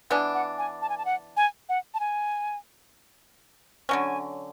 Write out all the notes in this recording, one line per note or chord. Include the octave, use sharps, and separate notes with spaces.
E3 B3 D4 G#5
F#5
G#5
A5
G#5
A5
F#5
G#5
F#5
A5
G#5
D3 F#3 C#4 G#5